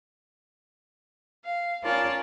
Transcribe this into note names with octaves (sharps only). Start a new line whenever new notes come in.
F5
C#4 F4 A#4 D5 A5